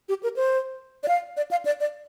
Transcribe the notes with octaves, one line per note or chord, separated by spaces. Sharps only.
G4
A#4
C5
D5
F5
D5
F5
D5
D5